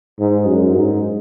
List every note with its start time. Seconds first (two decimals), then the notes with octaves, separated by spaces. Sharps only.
0.19 G#2
0.47 F#2
0.76 G#2